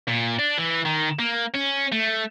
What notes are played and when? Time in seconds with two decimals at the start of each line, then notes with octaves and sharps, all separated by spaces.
0.08 A#2
0.39 D4
0.58 E3
0.85 D#3
1.19 A#3
1.55 C#4
1.92 A3